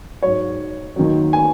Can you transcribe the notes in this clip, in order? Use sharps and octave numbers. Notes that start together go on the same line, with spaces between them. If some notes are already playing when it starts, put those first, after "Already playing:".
G#2 F#3 C#5
D#2 D#3 F#3
G#5